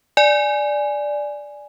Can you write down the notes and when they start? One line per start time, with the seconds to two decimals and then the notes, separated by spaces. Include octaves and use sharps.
0.17 D5 G#5